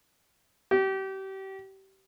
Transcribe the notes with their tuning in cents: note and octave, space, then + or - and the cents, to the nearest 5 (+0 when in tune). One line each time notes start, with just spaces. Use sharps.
G4 -30